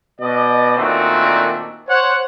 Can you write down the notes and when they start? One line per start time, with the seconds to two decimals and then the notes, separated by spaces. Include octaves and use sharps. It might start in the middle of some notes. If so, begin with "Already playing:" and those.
0.21 B2 D5 D#5
0.77 A#2 D#3 A3 C4 D4 F#4
1.88 C5 C#5 F#5